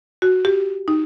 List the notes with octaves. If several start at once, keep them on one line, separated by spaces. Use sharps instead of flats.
F#4
G4
D#4